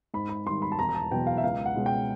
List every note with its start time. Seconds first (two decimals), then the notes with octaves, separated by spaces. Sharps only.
0.14 G#2 B5
0.29 B5
0.46 D#3 G3 C6
0.62 B5
0.72 A5
0.79 E1 A#5
0.89 A#5
0.95 A5
1.11 E2 B2 F#3 B3 G5
1.27 F5
1.37 E5
1.44 C#2 F5
1.66 F#5
1.76 B2 G#3 C#4
1.86 G5